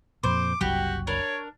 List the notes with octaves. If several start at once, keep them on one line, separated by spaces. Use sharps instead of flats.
F2 A#2 C5 D6
F#1 C2 F#3 F#4 G4
D4 A#4 C#5